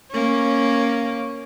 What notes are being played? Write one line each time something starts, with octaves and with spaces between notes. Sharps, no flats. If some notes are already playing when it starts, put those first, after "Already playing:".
A#3 C#4